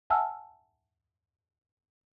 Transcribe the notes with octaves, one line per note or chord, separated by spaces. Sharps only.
E5 F#5 G#5 A5 E6 F6